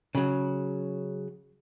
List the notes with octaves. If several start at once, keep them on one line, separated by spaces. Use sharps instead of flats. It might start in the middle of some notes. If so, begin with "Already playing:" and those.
C#3 F#3